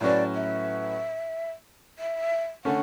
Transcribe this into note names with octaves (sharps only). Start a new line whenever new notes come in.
A2 F#3 C#4 F#4 B4 D5
E5
E5
D3 A3 C#4 F#5